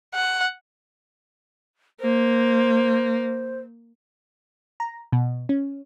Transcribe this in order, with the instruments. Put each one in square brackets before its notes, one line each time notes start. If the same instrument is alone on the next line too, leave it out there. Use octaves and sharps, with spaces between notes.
[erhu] F#5
[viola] A#3 [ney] C5
[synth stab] A#5
B2
C#4